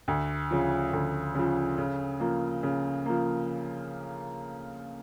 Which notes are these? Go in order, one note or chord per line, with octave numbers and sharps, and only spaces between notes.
D2
C#3 F3
D2
C#3 F3
C#3
F3 A#3
C#3
F3 A#3